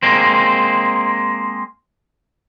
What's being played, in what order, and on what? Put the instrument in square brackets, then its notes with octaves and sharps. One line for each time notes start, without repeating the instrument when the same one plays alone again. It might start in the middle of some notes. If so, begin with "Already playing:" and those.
[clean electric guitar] G#3 A#3 C4